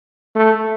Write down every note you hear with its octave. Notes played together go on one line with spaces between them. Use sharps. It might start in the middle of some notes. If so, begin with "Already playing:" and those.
A3